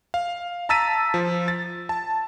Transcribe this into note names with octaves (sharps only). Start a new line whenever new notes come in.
F5
A5 A#5 E6 A6 B6 D#7
F3
A6
A5